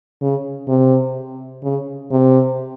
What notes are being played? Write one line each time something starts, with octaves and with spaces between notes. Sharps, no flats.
C#3
C3
C#3
C3